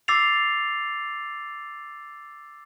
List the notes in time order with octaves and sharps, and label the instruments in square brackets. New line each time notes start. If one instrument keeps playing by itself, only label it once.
[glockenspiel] D6 E6 A6 C7 F7